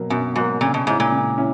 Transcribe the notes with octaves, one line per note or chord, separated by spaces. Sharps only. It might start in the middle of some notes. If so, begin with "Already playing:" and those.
Already playing: B2 F#3 A#3
F#2 B2
G#2 F#3 A#3
A#2 C#3
B2
G#2 G#3 C#4 E4
A#2
C#3
C#4 E4